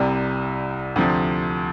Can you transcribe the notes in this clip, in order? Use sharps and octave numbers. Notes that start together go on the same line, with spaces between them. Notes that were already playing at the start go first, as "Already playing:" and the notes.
Already playing: C2 C3 G3
D2 C3 F3